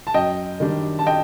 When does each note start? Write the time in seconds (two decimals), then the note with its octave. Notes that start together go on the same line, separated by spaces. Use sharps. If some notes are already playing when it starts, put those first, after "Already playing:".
0.07 A5
0.14 F#2 D#5 G5
0.60 D#3 G3 D4
0.99 A5
1.06 D#5 G5